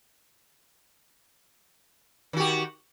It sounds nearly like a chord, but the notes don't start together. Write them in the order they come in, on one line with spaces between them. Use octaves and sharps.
D#3 F#4 G4